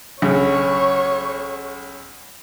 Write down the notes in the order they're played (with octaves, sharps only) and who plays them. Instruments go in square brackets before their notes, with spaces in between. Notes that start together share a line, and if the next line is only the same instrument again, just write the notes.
[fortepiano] B1 C#3 [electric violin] C#5